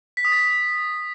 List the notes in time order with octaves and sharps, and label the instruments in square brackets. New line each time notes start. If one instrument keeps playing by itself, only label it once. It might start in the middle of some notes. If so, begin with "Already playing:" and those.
[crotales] B6
D#6
A6
D#6
B6